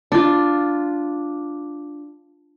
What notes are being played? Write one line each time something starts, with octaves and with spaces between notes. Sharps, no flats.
D4 F4